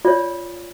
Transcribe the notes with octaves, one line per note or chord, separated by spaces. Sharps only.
F4 C#5 D5